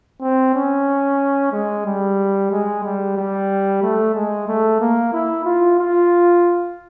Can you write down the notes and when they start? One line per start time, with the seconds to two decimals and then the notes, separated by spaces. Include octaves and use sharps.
0.22 C4
0.55 C#4
1.53 G#3
1.86 G3
2.51 G#3
2.84 G3
3.17 G3
3.82 A3
4.14 G#3
4.48 A3
4.81 A#3
5.13 E4
5.45 F4
5.79 F4